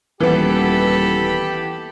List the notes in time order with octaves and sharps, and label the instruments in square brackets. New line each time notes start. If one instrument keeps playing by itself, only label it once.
[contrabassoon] D#1 [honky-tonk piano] E3 B3 [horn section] G4 [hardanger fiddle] A4 B5